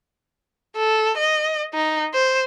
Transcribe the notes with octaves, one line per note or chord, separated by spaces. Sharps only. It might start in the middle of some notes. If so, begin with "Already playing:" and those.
A4
D#5
D#4
C5